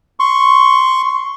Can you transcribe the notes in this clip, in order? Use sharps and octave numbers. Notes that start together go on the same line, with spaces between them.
C6 C#6